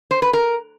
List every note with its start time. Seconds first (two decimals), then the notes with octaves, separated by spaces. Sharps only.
0.11 C5
0.22 B4
0.33 A#4